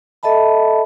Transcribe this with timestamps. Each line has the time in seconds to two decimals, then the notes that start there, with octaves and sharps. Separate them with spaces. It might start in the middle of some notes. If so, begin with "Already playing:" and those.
0.23 A4 D#5 E5 A5 B5